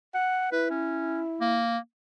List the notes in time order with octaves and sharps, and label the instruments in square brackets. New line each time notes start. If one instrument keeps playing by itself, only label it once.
[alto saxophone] F#5
[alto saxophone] E4 [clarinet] B4
[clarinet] C#4
A#3